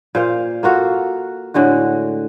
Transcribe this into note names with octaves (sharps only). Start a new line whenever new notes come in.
A#2 C5 F5
A#3 F4 F#4 A4
A2 D3 G#3 F#4